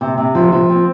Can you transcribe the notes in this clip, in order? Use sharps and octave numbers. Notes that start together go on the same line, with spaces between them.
C3
C3
F3
F3
C4